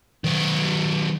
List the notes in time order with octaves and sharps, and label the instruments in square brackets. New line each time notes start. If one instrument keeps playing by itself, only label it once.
[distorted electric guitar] D#3 F#3